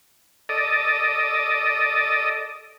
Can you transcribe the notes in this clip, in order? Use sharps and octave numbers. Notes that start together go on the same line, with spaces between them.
A4 D5 D#5